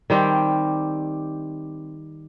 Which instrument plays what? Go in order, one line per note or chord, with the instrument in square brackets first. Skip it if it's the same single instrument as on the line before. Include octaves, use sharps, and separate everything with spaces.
[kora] D#3 G3 C4 G4